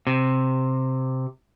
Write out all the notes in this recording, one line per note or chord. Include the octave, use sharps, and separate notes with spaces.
C3